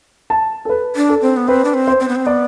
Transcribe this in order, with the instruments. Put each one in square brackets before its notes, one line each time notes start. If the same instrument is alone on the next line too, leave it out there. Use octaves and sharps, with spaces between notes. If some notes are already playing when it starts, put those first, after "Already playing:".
[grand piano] A5
A4
B4
[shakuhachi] D4
[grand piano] A4
[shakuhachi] C4
B3
[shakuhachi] C4 [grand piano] B4
[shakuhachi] D4
C4
[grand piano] C5
[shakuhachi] C4
B3
C4
[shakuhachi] B3 [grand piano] D5